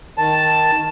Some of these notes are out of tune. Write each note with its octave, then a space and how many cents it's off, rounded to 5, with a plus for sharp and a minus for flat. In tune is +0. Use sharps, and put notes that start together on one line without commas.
D#3 +5 A5 +0